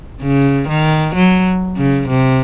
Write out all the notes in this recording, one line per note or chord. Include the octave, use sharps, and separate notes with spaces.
C#3
D#3
F#3
C#3
C3